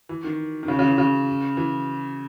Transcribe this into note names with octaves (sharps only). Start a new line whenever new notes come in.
E3
D#3
D#3
C#3
C#3
E3
C#3
E3